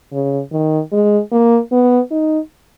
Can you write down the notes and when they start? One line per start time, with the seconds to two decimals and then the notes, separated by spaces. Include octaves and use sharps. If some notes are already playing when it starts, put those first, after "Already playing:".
0.13 C#3
0.52 D#3
0.92 G#3
1.32 A#3
1.72 B3
2.11 D#4